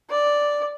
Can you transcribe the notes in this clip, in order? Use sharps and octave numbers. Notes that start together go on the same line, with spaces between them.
D5